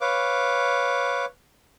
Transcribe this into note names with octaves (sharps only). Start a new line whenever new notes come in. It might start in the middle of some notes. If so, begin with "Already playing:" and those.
B4 C#5 F5 D6